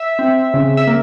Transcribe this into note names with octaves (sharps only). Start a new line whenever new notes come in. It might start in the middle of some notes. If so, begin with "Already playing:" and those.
Already playing: E5
C4
C#3
E5
A#3